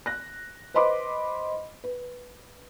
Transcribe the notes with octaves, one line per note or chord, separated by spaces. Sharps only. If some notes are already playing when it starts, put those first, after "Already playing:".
F#6 A#6
B4 C5 D#5 B5 C6 D6
B4